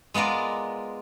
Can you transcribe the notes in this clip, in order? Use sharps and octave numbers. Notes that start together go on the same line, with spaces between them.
G#3 B3 F4 A#4 D5